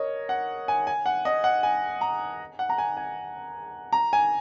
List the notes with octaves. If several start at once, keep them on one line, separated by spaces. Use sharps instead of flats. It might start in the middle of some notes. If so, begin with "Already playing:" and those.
Already playing: A#4 C#5 D#5
F#5
G#5
G#5
F#5
D#5
F#5
G#5
A#5
F#5
A#5
G#5
G#5
A#5
G#5